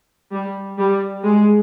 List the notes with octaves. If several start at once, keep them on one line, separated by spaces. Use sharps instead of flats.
G3
G3
G#3